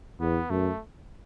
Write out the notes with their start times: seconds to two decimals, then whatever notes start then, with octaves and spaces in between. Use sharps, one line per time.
0.20 E2 B3
0.50 F#2 A3